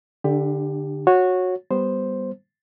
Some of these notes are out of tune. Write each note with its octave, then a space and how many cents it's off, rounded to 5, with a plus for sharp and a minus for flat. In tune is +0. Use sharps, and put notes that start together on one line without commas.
D3 +0 D4 +40 G4 +20
F#4 -15 C#5 -10
G3 +0 B3 +0 C5 +0